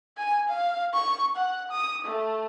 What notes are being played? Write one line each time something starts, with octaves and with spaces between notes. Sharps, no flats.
G#5
F5
C#6
F#5
D#6
A3